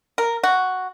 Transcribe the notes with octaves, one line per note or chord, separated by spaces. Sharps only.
A#4
F#4